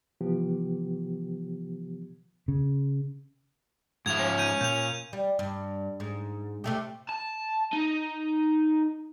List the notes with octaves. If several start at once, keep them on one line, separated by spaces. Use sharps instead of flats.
C3 E3 F3 B3 G4
C#3
G#2 F3 E5 G#6 F7
C#4
G6 G#6 D#7
A#2 G6 F7
G3
G2
G#2
C3 A3 G4
A5
D#4